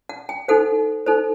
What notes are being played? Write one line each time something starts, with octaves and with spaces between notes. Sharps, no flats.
F#5
G5
D#4 A4 C5 F#5
D#4 A4 C5